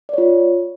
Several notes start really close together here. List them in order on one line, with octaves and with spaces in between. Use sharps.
D5 C#5 F4